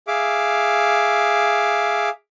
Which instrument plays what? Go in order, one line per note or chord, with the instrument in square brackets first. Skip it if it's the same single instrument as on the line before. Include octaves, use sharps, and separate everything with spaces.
[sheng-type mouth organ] G#4 E5 F5 D6